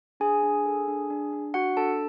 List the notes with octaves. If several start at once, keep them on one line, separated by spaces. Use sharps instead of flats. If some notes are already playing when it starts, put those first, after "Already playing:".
D4 G#4 G#5
D4
A4
D4
D4
D4
D4 F#4 F#5
D4 A4 A5